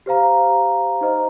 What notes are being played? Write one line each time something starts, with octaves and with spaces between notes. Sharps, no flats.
G4 C5 F5 A#5
D#4 C5 D#5 A#5